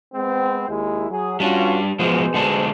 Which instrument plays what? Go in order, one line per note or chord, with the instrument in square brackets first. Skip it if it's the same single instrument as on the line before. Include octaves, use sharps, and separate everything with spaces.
[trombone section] G#3 B3 C4
D#2 G#3 E4
F#3 G#4
[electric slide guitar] G3 D4 [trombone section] C#4 F4 F#4
[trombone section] B2 G#4 C5 [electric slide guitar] F3 G#3 B3
[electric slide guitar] D3 G#3 D4